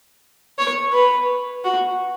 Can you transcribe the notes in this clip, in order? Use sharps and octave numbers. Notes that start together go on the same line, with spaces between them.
C#5
B4
F#4